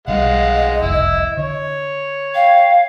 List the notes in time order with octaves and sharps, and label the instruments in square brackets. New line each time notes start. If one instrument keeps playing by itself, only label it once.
[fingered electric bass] B1 F3 G3 [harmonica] G#3 F5 F#5 [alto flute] D#5
[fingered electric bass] F#1 C2 F2 [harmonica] E4
[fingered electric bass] D3 [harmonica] C#5
[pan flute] F5 [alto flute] G5